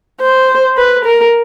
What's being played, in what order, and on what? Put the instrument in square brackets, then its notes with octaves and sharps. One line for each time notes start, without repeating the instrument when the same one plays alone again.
[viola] C5
B4
A#4